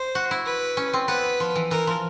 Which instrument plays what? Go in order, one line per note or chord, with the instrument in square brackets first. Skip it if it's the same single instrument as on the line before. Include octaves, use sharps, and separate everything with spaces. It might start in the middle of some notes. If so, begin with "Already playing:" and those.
Already playing: [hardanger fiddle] C5
[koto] F#4
E4
[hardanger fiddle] B4
[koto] C#4
C4
[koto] B3 [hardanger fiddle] B4
[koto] F3
E3
[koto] E3 [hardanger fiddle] A#4
[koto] F3